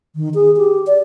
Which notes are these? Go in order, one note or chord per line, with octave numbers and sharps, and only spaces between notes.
D#3
G#4
G4
D5